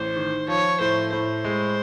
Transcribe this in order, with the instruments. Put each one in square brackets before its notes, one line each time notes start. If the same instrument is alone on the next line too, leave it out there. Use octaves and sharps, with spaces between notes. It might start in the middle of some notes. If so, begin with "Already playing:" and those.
Already playing: [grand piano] A1 [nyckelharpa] C5
[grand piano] D#3
[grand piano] F3 [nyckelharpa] C#5
[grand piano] A2 [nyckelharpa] C5
[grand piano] A2 [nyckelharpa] C5
[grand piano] G#3